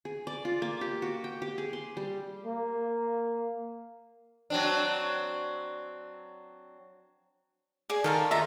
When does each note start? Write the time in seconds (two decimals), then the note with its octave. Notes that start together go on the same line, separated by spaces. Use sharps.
0.05 G#4
0.27 D5
0.45 F4
0.62 A#3
0.81 G4
1.02 F#4
1.24 G5
1.42 G4
1.58 G#4
1.73 C6
1.97 G3
2.45 A#3
4.50 F#3 C4 D4
7.90 G#4 D5 G#5
8.04 D#3 A4 F5 A#5
8.31 D#4 F4 E5 A#5